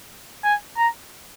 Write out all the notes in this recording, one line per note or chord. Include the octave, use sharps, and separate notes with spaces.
G#5
A#5